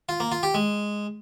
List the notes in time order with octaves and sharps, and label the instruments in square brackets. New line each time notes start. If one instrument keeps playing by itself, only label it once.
[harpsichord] F4
A#3
F4
G4
G#3